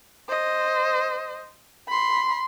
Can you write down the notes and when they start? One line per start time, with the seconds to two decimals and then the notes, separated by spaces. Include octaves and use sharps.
0.29 C5 D#5
1.88 B5 C6